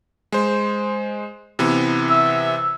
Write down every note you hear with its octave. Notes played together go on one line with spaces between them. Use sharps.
G#3 C5
C3 E3 B3
E5